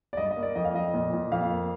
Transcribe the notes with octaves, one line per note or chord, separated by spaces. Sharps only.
D5
G2 D#5
D#5
A#3
D5
F2 D#5
F5
F2 D#5
A#2
A#2
F2 F5
A#3